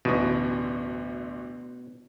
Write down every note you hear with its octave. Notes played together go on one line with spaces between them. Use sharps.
A1 D2 B2